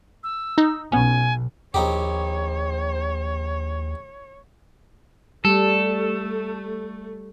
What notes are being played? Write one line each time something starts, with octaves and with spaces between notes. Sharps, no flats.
E6
D#4
B1 B3 C#4 G#5
A#1 D#2 D#4 G4 C#5
G3 A3 A4